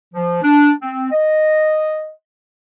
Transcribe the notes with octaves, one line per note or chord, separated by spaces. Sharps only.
F3
D4
C4
D#5